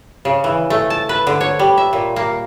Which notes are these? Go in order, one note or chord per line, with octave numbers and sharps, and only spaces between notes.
C#3
E3
A3
A5
B4
D3
C#5
G3
E5
A#2
A#3